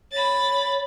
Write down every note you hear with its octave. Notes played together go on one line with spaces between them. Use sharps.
C#5 B5 A6